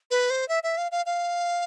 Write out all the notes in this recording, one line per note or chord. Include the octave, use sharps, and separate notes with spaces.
B4
C5
E5
E5
F5
F5
F5